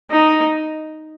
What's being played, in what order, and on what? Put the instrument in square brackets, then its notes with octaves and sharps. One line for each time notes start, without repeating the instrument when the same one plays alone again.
[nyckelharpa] D#4